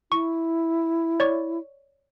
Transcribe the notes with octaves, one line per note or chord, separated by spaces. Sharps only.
E4 C#6
C#5 D5 C#6